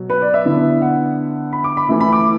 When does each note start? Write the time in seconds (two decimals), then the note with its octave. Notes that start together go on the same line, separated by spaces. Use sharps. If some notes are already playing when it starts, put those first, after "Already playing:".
Already playing: B2 F#3
0.10 B4
0.22 D5
0.34 E5
0.45 D3 B3 E4
0.82 F#5
1.53 B5
1.64 D6
1.77 B5
1.89 E3 A3 E4
2.00 B5
2.12 D6